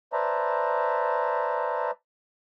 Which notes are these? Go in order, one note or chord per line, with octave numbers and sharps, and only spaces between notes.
B4 C5 D5 E5 A5 A#5